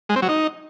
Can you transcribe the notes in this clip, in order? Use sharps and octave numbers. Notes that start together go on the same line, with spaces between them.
G#3
C4
F#3
D#4